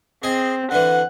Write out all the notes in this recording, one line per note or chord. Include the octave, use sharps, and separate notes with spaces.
C4 G#4 D#5
D3 E3 F#5